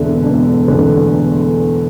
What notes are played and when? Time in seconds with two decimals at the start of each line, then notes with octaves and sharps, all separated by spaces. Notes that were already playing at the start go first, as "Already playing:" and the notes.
Already playing: E1 E2 D3 E5
0.23 E1
0.68 E2 D3